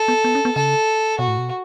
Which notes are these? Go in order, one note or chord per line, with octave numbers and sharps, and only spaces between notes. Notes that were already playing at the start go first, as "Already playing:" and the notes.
Already playing: A4
B3
B3
C#4
B3
C#3 A4
B2 F#4
A2
B2